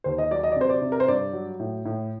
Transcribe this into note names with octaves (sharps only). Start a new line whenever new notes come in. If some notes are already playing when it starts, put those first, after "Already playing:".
D#2 C5
D#5
F#3 D5
D#5
D5
C3 C5
D5
C3
A#4
C5
G2 D5
F#3
A2
A2